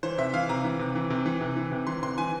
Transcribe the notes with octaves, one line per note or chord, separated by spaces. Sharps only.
E3 C5
C3 E5
E3 F5
C3 A#5
E3
C3
E3
C3
E3
C3
E3
C3
E3 C6
C3 C6
E3 G#5